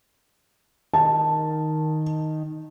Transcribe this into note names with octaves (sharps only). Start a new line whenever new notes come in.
D#3 A5